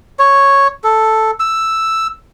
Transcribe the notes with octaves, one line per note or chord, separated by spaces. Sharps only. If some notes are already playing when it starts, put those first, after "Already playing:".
C#5
A4
E6